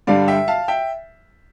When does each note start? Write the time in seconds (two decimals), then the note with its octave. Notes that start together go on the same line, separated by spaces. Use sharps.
0.07 G2 D3 G3 D5 F5
0.28 E5 G5
0.48 F5 A5
0.68 E5 G5